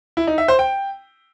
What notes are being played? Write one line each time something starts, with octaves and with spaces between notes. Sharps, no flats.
E4
D#4
E5
C5
G5